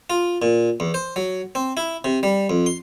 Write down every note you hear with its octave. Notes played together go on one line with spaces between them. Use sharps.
F4
A#2
E2
C5
F#3
C4
E4
C3
G3
F2
C6